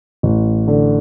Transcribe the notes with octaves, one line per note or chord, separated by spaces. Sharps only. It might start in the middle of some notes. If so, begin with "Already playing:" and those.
A1
D3